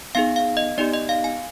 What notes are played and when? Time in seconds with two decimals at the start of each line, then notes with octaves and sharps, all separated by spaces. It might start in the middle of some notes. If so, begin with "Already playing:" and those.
0.15 B3 D#4 G#4 F5
0.36 F5
0.57 D#5
0.78 B3 D#4 G4 D5
0.93 D#5
1.09 F5
1.24 G#5